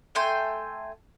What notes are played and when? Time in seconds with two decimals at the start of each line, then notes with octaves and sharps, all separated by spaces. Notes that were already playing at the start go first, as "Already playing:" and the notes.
0.15 A3 G5 G#5 C6